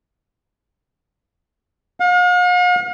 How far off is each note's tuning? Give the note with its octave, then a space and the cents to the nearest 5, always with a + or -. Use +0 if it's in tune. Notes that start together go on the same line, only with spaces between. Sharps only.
F5 +45